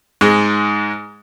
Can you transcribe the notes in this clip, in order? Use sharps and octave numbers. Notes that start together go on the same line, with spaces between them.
G#2 G#3